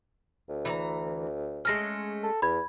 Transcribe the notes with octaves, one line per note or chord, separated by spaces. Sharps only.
D2
E3 D5 A#5
G#3 A3 C#4 F6 A#6
A4
E2 B5 G#6